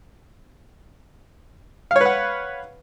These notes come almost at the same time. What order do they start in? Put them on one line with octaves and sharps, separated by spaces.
F5 C#5 B4 F#5